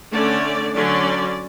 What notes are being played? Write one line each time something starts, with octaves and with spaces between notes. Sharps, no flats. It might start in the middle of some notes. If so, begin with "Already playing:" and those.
D3 A3 C#4 D5
D3 F#3 C#4 D5